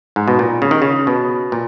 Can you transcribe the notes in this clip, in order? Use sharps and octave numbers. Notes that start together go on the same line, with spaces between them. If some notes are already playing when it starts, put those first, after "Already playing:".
G#2
B2
A#2
C#3
D#3
C#3
B2
A#2